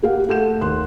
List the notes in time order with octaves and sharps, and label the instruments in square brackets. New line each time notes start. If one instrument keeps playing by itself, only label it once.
[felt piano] A#3 G4 F5 F#5
A3 F#5 G6 E7
D#2 C6 F#6